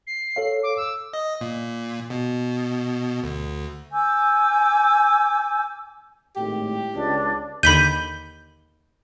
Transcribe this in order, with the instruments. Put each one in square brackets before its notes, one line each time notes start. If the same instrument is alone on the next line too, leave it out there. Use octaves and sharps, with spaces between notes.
[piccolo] C7
[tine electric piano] A4 C#5 F5
[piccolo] D6
E6
[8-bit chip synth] D#5
A#2
B2
D2
[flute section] G#5 D6 E6 G6
[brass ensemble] G#1 A2 [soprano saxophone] G4
[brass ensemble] C#2 [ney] D4
[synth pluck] D#2 D3 [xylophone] B5 B6 D#7 [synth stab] G6